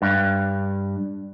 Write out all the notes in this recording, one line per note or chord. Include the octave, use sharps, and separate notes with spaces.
G2